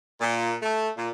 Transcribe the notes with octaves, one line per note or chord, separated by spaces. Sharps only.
A#2
A3
A#2